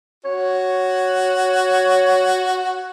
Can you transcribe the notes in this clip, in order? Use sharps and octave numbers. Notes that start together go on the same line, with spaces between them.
F#4 C#5